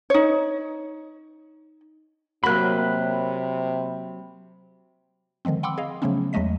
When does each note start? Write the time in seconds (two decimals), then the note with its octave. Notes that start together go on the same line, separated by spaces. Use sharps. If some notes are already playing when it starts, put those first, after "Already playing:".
0.10 D#4 C#5
2.44 C3 F#3 A#3 F#4 B5 F#6
5.45 D3 D#3 F3 G#3 C4
5.63 F#5 G5 B5 C6 D6 E6
5.78 G#4 D#5 F5
6.02 C#3 F3 F#3 A3 B3 C#4
6.33 E2 F#3 G#3 A3 D#5 B6